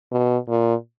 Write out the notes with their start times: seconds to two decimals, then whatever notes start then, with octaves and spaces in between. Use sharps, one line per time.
0.12 B2
0.49 A#2